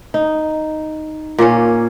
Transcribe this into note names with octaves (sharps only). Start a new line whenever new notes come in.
D#4
A#2 A#3 C#4 C#5